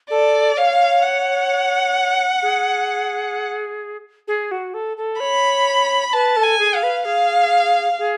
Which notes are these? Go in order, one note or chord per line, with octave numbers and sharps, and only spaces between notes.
A4 D5
C#5 F5
F#5
G#4
G#4
F#4
A4
A4
C#5 B5
B4 A5
A4
G#5
G#4
F5
B4
G#4 F5
G#4